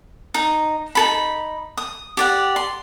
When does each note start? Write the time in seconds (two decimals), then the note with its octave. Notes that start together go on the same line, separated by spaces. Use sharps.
0.34 D#4
0.95 D#4 A4 B5
1.77 D#6
2.17 G4 D5 F#5
2.56 C6